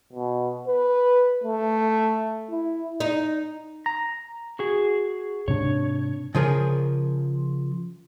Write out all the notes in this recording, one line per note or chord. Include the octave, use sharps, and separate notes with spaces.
B2
B4
A3
E4
D#4
A#5
F#4 G#4
G#2 C3 D4 C#5
C#3 F3 G#4 A#4